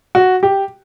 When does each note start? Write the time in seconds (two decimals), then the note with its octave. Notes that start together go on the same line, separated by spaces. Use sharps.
0.15 F#4
0.43 G4